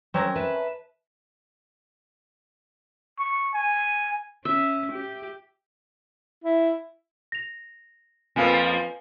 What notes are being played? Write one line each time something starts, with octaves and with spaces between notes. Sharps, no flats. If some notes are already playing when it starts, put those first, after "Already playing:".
F#3 C4 C#4 A#4
B4 E5 A5
C#6
G#5
C#4 E5
G4
E4
A#6 F7
F2 F3 A#3 B4 F5 G#5